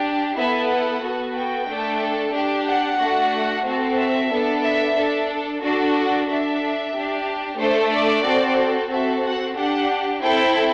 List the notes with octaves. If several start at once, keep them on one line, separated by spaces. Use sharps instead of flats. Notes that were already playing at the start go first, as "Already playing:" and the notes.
Already playing: D4 G4
B3 E4 A4 E5
F#5
B3 F#4 A4
G5
A3 D4 A4
D4 G4
F#5
A3 D4 F#4
C4 F#4 A4
E5
B3 D4 A4
E5
D4 A4
D4 F#4 A4
F#5
D4 A4 E5
D4 G4
A3 D4 A4 C5
D5
C4 F#4 A4
C4 F#4 A4 E5
F#5
D4 G4 F#5
C4 E4 A4 G5